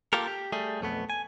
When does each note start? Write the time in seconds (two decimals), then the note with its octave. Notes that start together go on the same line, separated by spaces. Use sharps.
0.13 A#3 F4 G4 A4 A#4
0.27 G4
0.53 G3 A3 G#4
0.81 B1 F2 A3 B3
1.10 G#5